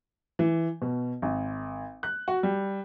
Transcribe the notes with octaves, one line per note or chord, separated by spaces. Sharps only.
E3
B2
G#1
F#6
F#4
G3